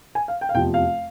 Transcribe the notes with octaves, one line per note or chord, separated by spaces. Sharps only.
G#5
F5
G5
F5
F1 E2 C3 F3 G5
F5